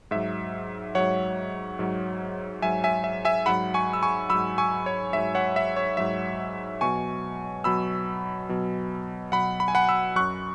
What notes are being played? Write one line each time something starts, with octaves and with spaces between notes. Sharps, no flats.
G#2 F#3 E5
G#2 F#3 C#5 F#5
G#2 F#3
G#2 F#3 E5 G#5
E5 G#5
E5
E5 G#5
G#2 F#3 F#5 B5
G#5 C#6
E6
G#5 C#6
F#3 B5 E6
G#2
G#5 C#6
C#5
G#2 F#3 E5
C#5 F#5
E5
C#5
G#2 F#3 E5
B2 F#3 G#5 C#6
B2 F#3 B5 E6
B2 F#3
B2 F#3 F#5 B5
B5
G#5
F#5 B5
B5 E6
F#2 F#3 C#6 F#6